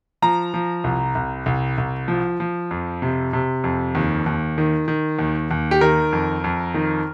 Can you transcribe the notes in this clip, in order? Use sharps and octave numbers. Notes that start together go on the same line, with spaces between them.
F3 A#5
F3
C2
C2
C2
C2
F3
F3
F2
C3
C3
F2
D#2
D#2
D#3
D#3
D#2
D#2
G4
D#3 A#4
F2
F2
D#3